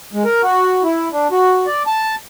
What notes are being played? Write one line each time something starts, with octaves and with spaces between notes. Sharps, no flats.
G#3
A#4
F#4
E4
D4
F#4
D5
A5